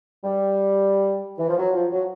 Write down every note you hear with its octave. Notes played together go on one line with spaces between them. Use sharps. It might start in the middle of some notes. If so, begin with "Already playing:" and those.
G3
E3
F3
F#3
F3
F#3